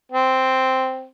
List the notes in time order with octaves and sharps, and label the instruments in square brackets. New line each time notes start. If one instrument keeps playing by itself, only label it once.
[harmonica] C4